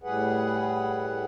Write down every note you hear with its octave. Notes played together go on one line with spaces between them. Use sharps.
A2 G3 G#4 B4 F#5